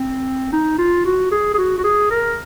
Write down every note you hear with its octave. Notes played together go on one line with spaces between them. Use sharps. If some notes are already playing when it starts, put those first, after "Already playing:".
Already playing: C4
D#4
F4
F#4
G#4
G#4
F#4
F#4
G#4
A#4